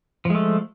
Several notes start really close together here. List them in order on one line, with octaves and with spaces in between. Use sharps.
F3 G#3 A3